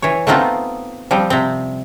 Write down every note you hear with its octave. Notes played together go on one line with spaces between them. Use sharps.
E3 C#5
A3 B3 C4 D#4 F4
F3 G3 C4
C3 C4